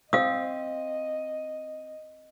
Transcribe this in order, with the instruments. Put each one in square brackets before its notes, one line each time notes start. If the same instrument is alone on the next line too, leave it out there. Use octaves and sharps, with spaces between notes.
[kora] C4 [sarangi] D#5 [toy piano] F5 D#6